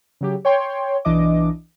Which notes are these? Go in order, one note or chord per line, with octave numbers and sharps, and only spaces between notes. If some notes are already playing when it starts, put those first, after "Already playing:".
C#3 F#3 G4
C#5 G5 C6
B1 E3 D4 D#5 D6